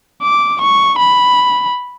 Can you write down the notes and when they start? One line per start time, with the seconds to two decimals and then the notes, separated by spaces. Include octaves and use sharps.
0.22 D6
0.61 C#6
0.99 B5